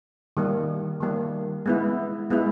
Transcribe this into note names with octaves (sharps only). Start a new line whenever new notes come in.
D#3 G3 A#3
D#3 G3 A#3
G#3 B3 E4
G#3 B3 E4